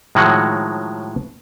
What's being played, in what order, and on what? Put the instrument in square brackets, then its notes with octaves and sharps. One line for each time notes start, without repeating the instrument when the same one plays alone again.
[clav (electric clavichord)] A2 D#3 F3 F#3 G#3 F#5